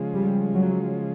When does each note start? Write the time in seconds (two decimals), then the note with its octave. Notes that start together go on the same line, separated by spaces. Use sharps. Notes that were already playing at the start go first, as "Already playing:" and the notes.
Already playing: C#3 F3 G#3
0.14 G3
0.53 F#3